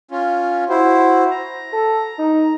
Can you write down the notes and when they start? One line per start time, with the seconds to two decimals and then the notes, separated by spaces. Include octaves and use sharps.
0.11 C#4 F4
0.69 E4 F#4 C5
1.31 A#5
1.73 A4
2.19 D#4